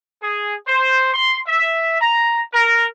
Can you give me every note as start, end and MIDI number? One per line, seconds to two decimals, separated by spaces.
0.22 0.55 68
0.67 1.10 72
1.14 1.40 84
1.47 1.97 76
2.00 2.41 82
2.53 2.86 70